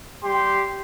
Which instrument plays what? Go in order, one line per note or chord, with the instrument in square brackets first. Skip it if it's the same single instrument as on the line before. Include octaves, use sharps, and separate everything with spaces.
[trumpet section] G3 G4 C6